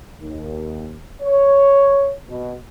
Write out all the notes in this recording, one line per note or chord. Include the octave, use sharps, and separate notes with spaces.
D#2
C#5
B2